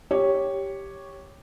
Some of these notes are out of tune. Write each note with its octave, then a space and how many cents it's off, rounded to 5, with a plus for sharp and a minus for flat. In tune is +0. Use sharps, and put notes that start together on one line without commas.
G4 +0 C#5 +0